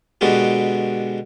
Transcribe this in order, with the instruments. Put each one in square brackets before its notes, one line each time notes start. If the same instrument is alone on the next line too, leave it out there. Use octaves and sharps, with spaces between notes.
[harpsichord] B2 D3 G#3 B3 F#4 G4